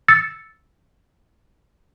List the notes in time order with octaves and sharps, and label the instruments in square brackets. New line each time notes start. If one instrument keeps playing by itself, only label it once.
[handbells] E6 A6 C#7